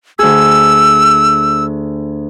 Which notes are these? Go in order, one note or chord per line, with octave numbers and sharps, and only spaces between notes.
D2 G#4 E6